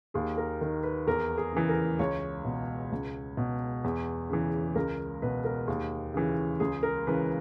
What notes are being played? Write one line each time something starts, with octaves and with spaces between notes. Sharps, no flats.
D#2 G#4
A#4
D#3 A#4
B4
E2 A#4
G#4
C#3 E3
A#4
C#2 C#5
B2
C#2
B2
E2
C#3 E3
C#2 A#4
B2 B4
A#4
D#2 G#4
C#3 E3
C#2 G#4
A#4
C#3 E3 B4